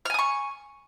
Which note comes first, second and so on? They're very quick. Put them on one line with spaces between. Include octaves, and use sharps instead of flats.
F6 G#5 D#6 C#6